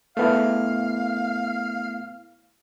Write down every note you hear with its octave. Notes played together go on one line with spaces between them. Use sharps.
A3 B3 E4 F5